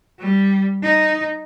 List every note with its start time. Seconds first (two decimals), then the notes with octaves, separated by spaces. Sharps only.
0.19 G3
0.83 D#4